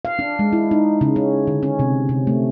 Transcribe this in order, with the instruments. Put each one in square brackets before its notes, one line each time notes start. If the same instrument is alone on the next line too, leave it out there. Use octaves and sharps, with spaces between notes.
[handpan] F5
D4
G#3
E4
D#4
C#3
C#4
D3
C#4
C3
C3
A3